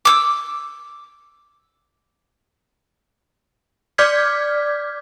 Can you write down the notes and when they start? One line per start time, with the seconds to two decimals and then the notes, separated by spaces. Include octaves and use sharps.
0.05 D6 E6
3.98 D5 D6 F6 G6 G#6 B6